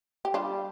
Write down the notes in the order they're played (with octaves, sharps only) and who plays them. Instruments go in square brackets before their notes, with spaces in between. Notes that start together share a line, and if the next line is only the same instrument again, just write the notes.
[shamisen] G4
[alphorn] G3 [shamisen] D4 F4